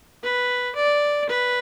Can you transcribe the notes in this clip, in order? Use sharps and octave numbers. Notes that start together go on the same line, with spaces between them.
B4
D5
B4